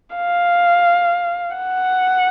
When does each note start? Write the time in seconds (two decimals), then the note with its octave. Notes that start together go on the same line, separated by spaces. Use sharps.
0.16 F5
1.56 F#5